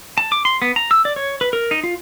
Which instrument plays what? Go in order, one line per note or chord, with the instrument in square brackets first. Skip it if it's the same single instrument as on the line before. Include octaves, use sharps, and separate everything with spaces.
[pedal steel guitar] A5
D6
C6
B3
A#5
E6
D5
C#5
B4
A#4
D#4
F4